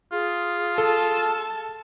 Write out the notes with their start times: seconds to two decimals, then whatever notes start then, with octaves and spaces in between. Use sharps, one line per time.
0.12 F4 G#4
0.78 A4 A5